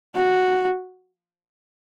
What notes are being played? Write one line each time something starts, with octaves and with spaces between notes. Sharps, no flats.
F#4